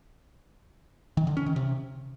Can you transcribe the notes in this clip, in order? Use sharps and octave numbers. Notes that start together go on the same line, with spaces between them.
D#3
D3
C#4
D#3
C3